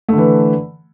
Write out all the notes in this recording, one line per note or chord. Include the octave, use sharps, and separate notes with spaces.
D3 E3 A3